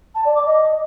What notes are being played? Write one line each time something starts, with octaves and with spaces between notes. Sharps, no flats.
A5
D5
D6
D#5